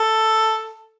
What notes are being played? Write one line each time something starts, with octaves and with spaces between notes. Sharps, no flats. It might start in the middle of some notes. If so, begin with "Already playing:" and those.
Already playing: A4